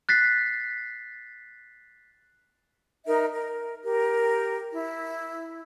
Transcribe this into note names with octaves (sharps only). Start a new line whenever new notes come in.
F#6 A6 B6 C7
D#4 A#4 E5
A#4
G4 A#4
E4